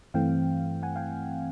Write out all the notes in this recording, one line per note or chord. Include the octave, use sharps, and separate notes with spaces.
G2 E3 A3 C4 F5 G5
F#5 G#5
F5 G5